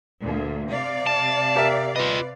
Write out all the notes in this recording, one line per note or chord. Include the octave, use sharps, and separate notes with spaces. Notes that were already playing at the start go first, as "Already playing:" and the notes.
D2 A#2
C3 D5 F5
A5
G4 A#4 E5
F4 B4 D#5